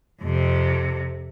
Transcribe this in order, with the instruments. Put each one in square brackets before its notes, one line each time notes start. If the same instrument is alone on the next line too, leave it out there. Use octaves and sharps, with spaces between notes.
[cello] F2 C3